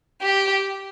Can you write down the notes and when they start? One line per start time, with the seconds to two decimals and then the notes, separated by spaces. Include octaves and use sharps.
0.21 G4